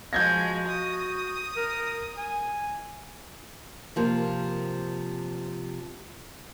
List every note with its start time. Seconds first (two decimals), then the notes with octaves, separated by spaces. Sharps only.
0.13 F3 G#3 F#4 G6 G#6 A#6
0.67 D#6
1.56 A#4
2.17 G#5
3.96 C3 F3 A#3